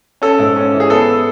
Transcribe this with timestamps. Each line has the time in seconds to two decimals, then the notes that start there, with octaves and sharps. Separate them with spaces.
0.22 C#4 A4
0.39 G#2
0.56 C#4
0.73 E3
0.80 G#4
0.90 B3 A4